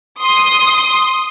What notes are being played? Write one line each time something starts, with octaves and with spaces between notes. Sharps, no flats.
C6 D#6